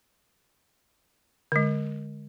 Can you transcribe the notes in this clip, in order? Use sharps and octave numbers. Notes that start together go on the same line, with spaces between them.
D3 G#3